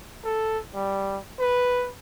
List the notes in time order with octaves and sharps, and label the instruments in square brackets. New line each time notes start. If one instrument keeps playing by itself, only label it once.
[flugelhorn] A4
G3
B4